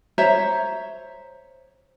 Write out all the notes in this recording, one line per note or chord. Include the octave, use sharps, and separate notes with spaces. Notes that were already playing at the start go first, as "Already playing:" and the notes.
C5 C#5 E5 A#5